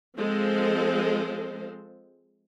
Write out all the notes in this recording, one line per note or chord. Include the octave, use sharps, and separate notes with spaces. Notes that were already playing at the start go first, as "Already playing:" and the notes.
F3 G#3 C4 A4 C5